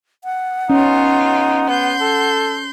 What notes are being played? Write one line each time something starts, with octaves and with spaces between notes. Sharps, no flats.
F#5
B3 C#4 D#4 F4
B3 C6 G6
A4